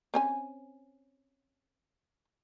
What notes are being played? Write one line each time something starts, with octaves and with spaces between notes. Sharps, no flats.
C4 C#4 G#5